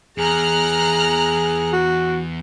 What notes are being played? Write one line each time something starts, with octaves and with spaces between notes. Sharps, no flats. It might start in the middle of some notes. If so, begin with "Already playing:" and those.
E2 G#4 A#5 F6 F#6
F#4